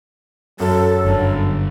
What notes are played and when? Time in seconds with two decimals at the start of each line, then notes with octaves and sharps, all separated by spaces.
0.60 F#2 F#3 A4
1.05 G1 G2 D3